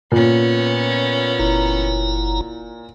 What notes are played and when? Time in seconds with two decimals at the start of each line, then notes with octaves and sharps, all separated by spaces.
0.12 A#2 B3 C#4
1.39 F#1 E4 A#5